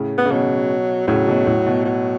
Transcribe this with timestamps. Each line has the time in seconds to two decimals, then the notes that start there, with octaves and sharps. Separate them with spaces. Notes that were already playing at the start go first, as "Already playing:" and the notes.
Already playing: A2 C#3
0.18 B3
0.26 C#3
0.31 B2 F#3
1.07 A2 C#3 F#3
1.28 B2
1.47 A2
1.66 B2
1.85 F#3